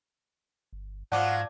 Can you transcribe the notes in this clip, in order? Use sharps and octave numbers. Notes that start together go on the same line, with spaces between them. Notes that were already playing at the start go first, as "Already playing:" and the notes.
G1
G#2 F3 F#3 F4 D5 F#5 A5 D6